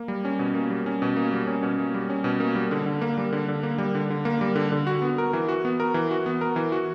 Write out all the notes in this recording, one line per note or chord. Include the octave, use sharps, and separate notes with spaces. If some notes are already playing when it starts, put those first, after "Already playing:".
Already playing: A#3
G3
C#4
B2
A#3
G3
C#4
B2
A#3
G3
C#4
B2
A#3
G3
C#4
B2
A#3
G3
D3
D3
A#3
G3
D3
D3
A#3
G3
D3
D3
A#3
G3
D3
D3
F#4
B3
A#4
E3
F#4
B3
A#4
E3
F#4
B3
A#4
E3
F#4